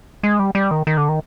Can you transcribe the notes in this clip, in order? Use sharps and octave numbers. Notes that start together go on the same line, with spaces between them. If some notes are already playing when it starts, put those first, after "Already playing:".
G#3
G3
G3
D#3
D#3
D3
D#3